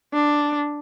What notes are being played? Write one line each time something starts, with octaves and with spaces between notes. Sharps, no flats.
D4